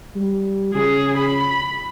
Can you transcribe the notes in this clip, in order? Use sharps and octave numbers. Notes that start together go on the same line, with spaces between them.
G3
C#3 G#4
B5